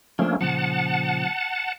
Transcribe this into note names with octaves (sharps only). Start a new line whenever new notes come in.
F3 A3 A#3 C#4 D4
A#2 C#3 F3 F#5 A5